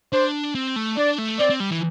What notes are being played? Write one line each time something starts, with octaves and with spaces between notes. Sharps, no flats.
D4 C5
C4
A3
D4 D5
A3
C4 D5
C4
G3
E3